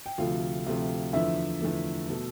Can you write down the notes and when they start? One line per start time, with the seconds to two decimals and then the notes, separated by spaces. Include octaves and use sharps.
0.06 G5
0.18 D2 C3 F3 A3 F4 F5
0.66 D2 C3 F3 A3
1.13 E2 D3 F3 A3 E4 E5
1.61 E2 D3 F3 A3
2.09 B2 A3 A4